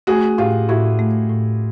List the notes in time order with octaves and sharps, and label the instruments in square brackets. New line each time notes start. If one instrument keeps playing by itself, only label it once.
[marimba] A3 [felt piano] F#4 G#4
[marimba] A2 [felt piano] F4 G4
[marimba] A2 [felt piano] E4 F#4
[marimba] A3
A2